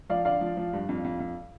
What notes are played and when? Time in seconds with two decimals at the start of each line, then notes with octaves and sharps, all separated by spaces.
0.09 F3 D5 F5
0.25 D3 D5 F5
0.41 F3
0.57 F3
0.73 G2
0.89 F2
1.04 F2
1.20 F2